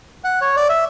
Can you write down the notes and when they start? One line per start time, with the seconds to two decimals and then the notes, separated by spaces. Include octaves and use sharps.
0.24 F#5
0.41 C#5
0.56 D5
0.69 E5